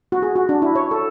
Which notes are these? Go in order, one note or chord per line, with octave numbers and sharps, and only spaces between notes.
F#4
G#4
F#4
D4
E4
C#5
A4